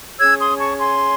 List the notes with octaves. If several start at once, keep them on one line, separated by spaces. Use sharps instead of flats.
C#4 G#4 C#5 E6 G#6
C6 D#6
A5 C#6
G#5 C6